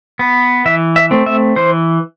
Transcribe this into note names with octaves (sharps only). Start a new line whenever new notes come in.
B3
E3 E5
E5
A3 C4
E5
E3 C5